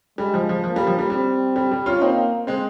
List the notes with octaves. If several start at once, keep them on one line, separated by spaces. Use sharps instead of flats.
G3 G#3
F3
F3
F3 A#3
G3
F3
G3
G3 C4
G3
G3
C#4 F4
A#3 C4 D#4
G#3 C4